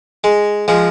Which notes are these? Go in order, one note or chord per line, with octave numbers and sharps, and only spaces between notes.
G#3
F3 G#3